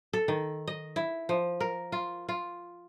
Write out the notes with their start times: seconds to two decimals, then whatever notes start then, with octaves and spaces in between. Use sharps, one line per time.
0.13 A4
0.28 D#3
0.67 D#5
0.96 E4
1.29 F3
1.60 A#4
1.92 F4
2.29 F4